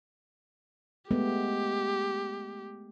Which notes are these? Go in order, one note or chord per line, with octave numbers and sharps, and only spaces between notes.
G#3 A3 B3 G4